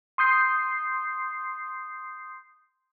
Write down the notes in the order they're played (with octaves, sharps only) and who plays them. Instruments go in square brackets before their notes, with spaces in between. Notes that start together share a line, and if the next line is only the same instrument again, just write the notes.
[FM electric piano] C6 D#6 G6 C7